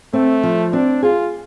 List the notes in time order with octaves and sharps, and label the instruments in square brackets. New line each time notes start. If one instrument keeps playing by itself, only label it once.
[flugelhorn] A3 [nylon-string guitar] C4
[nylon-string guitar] F3
[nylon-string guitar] C4 [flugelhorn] D4
[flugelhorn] F4 [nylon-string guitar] G#4